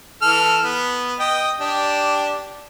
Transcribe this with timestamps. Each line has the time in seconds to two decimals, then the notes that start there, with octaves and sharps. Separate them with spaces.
0.22 E3 A4 F6
0.63 B3
1.20 D#5 G5
1.60 D4 G4